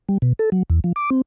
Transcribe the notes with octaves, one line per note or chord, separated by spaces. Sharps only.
G3
B2
A4
F#3
E2
F3
D6
C4